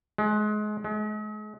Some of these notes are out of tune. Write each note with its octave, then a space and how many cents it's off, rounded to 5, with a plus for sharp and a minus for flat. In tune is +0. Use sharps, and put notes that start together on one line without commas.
G#3 +30
G#3 +40